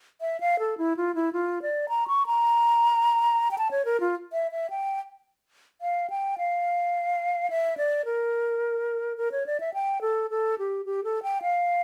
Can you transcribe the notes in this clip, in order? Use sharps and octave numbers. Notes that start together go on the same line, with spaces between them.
E5
F5
A4
E4
F4
E4
F4
D5
A#5
C#6
A#5
G5
A5
C#5
A#4
F4
E5
E5
G5
F5
G5
F5
E5
D5
A#4
A#4
C#5
D5
E5
G5
A4
A4
G4
G4
A4
G5
F5